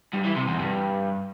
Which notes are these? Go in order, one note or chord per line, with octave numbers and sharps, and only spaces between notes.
G2
E3
C3
E2
G2